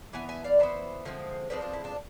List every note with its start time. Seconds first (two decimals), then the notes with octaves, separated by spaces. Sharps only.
0.13 E3 B3 E5 G#5
0.29 E5 G#5
0.44 D5 F5
0.59 E3 B3 C5 E5
1.05 D3 F3 G#3 C4
1.50 D3 F3 G#3 C4 B4 D5
1.61 D4 F4
1.73 E4
1.84 D4 F4